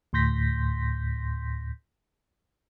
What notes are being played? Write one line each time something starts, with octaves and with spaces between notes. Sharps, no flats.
D2 A2 C6 G6 A#6 B6